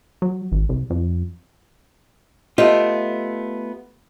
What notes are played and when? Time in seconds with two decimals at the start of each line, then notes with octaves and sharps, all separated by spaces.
0.22 F#3
0.52 G#1
0.69 C2
0.90 F2
2.58 A3 B3 F4 G4 D#5